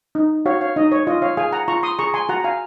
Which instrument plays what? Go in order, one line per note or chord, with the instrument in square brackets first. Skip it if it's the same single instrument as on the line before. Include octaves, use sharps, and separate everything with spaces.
[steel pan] D#4
F#4 C#5 F5
C#5 F5
D#4 D#5
C#5
F4 D#5
C#5 F5
G#4 F5 G#5
F#5 A#5
F4 A#5 C#6
C6 D#6
G#4 A#5 C#6
G#5 C6
F#4 F#5 A#5
A#5
F5 G#5